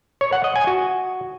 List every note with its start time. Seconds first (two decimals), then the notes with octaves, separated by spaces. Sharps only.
0.21 C#5
0.33 F#5
0.44 D#5
0.56 G#5
0.67 F#4